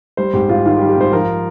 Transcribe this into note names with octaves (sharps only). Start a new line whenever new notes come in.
G3 C5
G#2 G4
G#2 F4
D#3 F4
G4
G3
G4
G#2 C5
F3 A#4